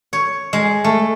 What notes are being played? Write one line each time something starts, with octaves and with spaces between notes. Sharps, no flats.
C#5
G#3
A3